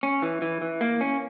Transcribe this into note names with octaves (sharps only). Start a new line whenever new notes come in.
C#4
E3
E3
E3
A#3
C#4